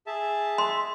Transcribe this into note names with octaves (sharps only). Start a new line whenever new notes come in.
G#4 E5 A5
C6